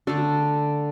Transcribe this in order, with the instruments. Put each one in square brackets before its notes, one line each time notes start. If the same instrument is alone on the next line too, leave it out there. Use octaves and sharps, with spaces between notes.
[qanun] D3 A3 D4 A4